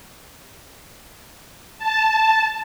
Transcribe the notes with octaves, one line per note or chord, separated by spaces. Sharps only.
A5